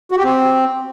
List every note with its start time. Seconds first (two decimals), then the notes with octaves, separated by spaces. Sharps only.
0.11 F#4
0.18 G4
0.24 C4